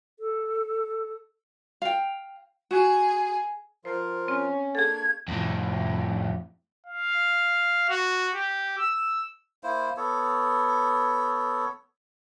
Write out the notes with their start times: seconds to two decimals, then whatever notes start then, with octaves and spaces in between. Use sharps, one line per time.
0.19 A4
1.82 F5 G5
2.71 F#4 G#4
3.85 F3 F4 A#4 C5
4.28 C4 C#4 F6
4.75 A#3 D4 G#4 A4 G#6
5.28 F2 A2
6.86 F5
7.89 F#4
8.35 G4
8.78 E6
9.63 A#3 E4 C5
9.97 B3 A4 C#5